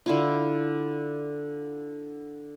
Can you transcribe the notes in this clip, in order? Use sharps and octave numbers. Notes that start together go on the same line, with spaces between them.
D3 E4 F4